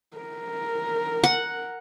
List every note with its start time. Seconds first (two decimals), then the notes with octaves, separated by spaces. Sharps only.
0.17 A#4
1.24 F#5